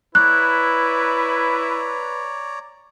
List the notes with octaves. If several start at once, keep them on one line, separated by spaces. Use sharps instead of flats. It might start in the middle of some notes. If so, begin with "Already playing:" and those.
E4 B4 C#5 D5 A#5 F#6